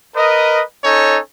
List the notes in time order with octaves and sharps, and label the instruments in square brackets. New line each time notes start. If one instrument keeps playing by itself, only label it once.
[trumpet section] A#4 B4 D#5
C#4 D#4 A4 C#5